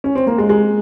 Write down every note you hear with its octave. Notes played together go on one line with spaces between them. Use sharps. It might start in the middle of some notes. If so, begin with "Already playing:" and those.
C#4
C4
A#3
G#3
G#3